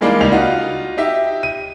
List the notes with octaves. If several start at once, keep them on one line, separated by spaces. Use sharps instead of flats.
E3 G3 G#3 A#3 D4 D#4
C#2 G3 D#4 F7
D#4 F4 F#4
D#4 G4 E5
D#7